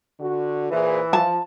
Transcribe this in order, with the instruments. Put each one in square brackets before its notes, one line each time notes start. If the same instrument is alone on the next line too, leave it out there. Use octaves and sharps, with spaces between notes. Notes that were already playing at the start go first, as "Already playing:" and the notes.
[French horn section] D3 F#4
[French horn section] A#2 G#4 C5 [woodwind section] E3
[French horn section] F3 [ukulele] A5